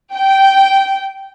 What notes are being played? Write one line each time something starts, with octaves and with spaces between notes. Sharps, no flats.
G5